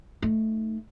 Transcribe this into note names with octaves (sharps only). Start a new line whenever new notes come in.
A3 D#4